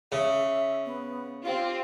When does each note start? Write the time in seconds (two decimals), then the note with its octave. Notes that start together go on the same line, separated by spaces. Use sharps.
0.12 C#3 E5
0.85 B3
1.45 C4 F4 G4